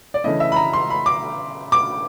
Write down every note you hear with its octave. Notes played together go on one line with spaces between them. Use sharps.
D5
C#3 E3 A3 C#4 E4 D#5
E5
B5
A#5
C6
B5
D6
D6